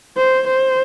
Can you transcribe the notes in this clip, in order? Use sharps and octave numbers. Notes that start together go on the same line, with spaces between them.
C5
C5